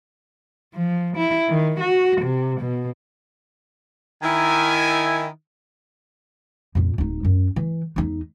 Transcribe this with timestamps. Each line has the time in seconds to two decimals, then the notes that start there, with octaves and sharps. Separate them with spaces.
0.74 F3
1.17 E4
1.49 D#3
1.80 F#4
2.21 C3
2.60 B2
4.23 D#3 E4 G#5
6.75 F2 A#2
6.98 D1 D#4
7.25 F#2
7.56 E3
7.96 E2 D#4